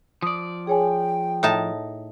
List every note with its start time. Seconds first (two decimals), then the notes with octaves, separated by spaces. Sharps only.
0.22 F3 D5 D#6
0.67 G#4 C#5 G5 G#5
1.43 A2 D#4 A5